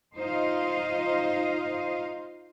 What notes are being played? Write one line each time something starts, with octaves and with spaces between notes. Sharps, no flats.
D#4 F4 C5 D#5 F5